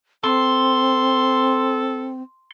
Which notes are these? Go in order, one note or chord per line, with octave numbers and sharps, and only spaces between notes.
C4 A4 C6